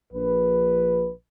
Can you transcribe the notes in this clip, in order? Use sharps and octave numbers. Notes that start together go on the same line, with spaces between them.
A#1 B4